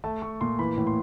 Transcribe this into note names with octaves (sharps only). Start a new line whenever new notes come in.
A3 A5
A3 C#6
A#2 C6
E3 B5
A2
C6